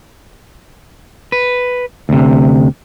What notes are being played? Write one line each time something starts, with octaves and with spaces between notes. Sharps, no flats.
B4
D2 C3